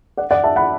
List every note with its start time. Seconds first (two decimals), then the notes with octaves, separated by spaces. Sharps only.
0.17 D5 F#5
0.31 D5 F#5
0.44 E5 A5
0.56 F#5 B5